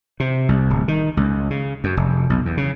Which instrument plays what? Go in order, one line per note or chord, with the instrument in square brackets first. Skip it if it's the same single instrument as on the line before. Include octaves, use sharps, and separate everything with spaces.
[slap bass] C3
C2
D1
D#3
C#2
C#3
F#2
F1
B1
E2
C#3